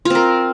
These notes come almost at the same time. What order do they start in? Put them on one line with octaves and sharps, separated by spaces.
F4 C4 A#4